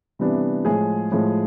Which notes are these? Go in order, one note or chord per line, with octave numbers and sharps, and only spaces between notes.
C3 E3 G3 B3 D4
A2 F3 G#3 G#4 G#5
A2 F3 G#3